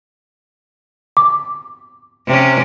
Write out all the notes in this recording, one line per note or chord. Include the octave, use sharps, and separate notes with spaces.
D6
C3 C#4